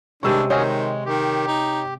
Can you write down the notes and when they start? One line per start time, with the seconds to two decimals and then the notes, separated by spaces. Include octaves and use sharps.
0.23 C3 D#3 G3 G#3 C#4 D4 C#6 E6
0.50 D#3 C4 C#4 F#4 G#4 C#5 D#5
0.68 G#3
1.06 D#3 G4
1.47 D#4